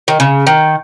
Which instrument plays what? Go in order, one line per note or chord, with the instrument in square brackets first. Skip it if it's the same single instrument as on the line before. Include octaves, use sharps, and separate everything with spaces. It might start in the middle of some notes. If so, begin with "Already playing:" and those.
[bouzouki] D#3
C#3
D#3